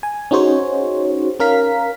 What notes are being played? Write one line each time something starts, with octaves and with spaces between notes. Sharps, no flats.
G#5
C#4 D#4 F#4 G#4 C5 C#5
C#4 A#4 F5 B6